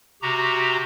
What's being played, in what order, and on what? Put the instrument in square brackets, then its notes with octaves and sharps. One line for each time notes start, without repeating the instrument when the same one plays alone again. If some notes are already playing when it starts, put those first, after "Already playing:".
[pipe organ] C3 F#4 G4 A#5